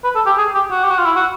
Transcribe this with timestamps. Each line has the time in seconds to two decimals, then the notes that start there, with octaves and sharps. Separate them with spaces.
0.04 B4
0.15 A4
0.26 G4
0.38 G#4
0.55 G4
0.71 F#4
0.84 G4
0.91 F#4
0.98 F4
1.05 E4
1.16 F#4